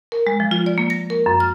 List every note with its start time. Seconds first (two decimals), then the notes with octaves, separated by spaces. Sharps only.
0.12 A#4
0.27 G#3
0.40 F3
0.51 F4
0.66 D5
0.78 A#3
0.90 A#6
1.10 A#4
1.26 F#2
1.40 F6